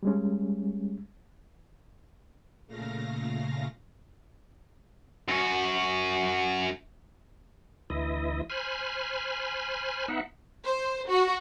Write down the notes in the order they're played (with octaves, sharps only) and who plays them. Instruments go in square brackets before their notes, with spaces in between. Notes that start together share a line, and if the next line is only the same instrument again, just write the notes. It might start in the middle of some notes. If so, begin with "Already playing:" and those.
[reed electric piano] G3 G#3 C#4
[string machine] A#2 C#3 A3 F5 A#6
[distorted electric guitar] F#2 F#4
[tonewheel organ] D2 E3 E4 D#5
C5 G#5 B5 F6
B3 D#4 E5 F#5
[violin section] C5
F#4